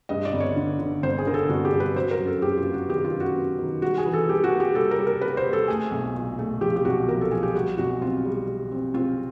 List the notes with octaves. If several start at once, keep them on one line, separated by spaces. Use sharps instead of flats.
G2 D#5
D5
G1
C#5
D3
D3
G1 C5
G#4
D3 A#4
A4
G1 F#4
G4
G2
B4
F#3 C5
A#4
F#2
A4
F#2 G4
F4
B3
F#4
D#3 G4
F4
F#2
F#4
B3
D#3
G3 F#4
G#4
E3
A4
G3 G4
F#4
A#3
G4
G3 A4
A#4
G3
A#4
A#3 B4
C5
G3
A4
A3 G#4
B1
A#2
A3
F3 G4
G4
B1 F#4
F3 A#4
A4
F3 G#4
G4
G3 F#4
B1 F#4
C4 F4
G3
G3
C4
C4 F4